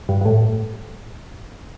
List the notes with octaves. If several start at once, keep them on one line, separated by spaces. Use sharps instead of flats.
G2
G2
A2